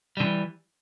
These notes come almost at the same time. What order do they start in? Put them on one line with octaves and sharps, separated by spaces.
G3 D3 E3